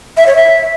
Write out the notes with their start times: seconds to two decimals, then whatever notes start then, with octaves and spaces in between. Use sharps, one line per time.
0.17 E5
0.26 C#5
0.36 E5